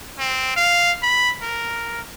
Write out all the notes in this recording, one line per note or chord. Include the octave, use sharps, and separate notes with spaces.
C4
F5
B5
A#4